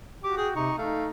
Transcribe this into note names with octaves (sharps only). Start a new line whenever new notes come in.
F#4 G4 D6
G#4 G5
C3 D#4 C#6
A3 D#4 F5